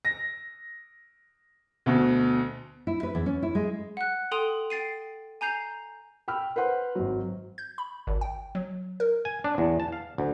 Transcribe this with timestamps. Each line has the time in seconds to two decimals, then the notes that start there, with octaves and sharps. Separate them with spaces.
0.05 A#6
1.86 D2 B2
2.87 E4
3.03 B4
3.15 E2
3.26 C#4
3.43 E4
3.55 G#3
3.97 F#5 F#6
4.31 A4 G5 C6 D#6 D#7 F7
4.70 G5 A6 C7 D#7
5.41 G#5 A#5 G6 C7 F7
6.28 G5 B5 E6 F6
6.56 B4 C5 F#5 C6
6.95 G#1 F#3
7.58 G6
7.78 B5
8.07 G#1
8.21 G5
8.55 F#3
9.00 A#4
9.25 G#5
9.44 D4
9.58 E2
9.80 A5
9.92 F5
10.18 D2